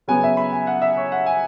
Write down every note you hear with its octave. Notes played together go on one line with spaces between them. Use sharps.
C#3 F#3 B3 G#5
E5
B5
G#5
F#5
E5
C#5
F#5
G#5